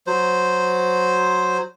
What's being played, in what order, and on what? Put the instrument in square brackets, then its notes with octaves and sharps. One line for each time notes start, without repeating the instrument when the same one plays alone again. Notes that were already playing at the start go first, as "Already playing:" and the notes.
[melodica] F#3 C5